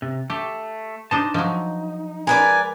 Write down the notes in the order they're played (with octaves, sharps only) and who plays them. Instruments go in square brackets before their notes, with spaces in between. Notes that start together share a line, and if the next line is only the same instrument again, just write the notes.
[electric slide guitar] C3
[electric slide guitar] A3 [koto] G4
[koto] D4 D#4 C5 [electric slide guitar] A5
[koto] F3 F#3 [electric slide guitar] D#4
[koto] G#3 [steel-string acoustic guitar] A#4 B4 D5 [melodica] G#5